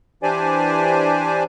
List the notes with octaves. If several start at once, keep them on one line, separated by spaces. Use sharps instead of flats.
E3 D4 G4 C5 D5 G#5